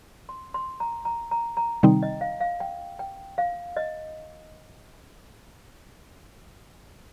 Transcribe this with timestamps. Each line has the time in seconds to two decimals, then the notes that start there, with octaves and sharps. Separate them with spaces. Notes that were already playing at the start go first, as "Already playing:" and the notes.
0.29 C6
0.54 C6
0.80 A#5
1.05 A#5
1.31 A#5
1.57 A#5
1.83 C3 D#3 G3 C4 D#4 G5
2.03 D#5
2.21 F5
2.40 F5
2.60 G5
2.99 G5
3.38 F5
3.77 D#5